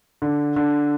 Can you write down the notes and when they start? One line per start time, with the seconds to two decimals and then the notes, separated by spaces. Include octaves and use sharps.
0.22 D3
0.56 D3